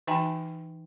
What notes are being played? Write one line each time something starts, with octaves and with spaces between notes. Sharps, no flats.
E3 D#4 E5 G5 G#5 A#5